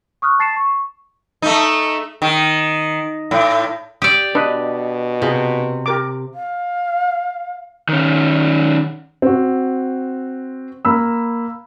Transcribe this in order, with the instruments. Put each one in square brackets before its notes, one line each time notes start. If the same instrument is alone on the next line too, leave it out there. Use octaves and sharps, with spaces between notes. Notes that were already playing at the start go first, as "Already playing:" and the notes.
[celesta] C#6 D#6 F6 F#6
A5 A6 C7 C#7 E7
C#6
[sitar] A3 D#4
D#3
A2
[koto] G4 D5 [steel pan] D#6 E6
[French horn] B2 [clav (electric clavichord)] D4 D#5 [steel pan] B4
[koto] C3 [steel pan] F4 G#4
[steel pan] G4 A#4 D6
[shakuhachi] F5
[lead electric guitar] D#3 C#4
[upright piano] C4 F#4
A#3 B5 E6